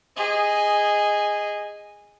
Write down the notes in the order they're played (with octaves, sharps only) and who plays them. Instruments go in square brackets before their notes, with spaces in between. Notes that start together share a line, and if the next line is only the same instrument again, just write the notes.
[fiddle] G#4 D#5